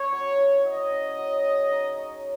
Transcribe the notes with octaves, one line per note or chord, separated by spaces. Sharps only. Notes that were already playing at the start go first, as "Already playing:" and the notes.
Already playing: C#4 C#5
F#3
E4
F#3 D#5
C#4
F#3
G#4
D#4
C#5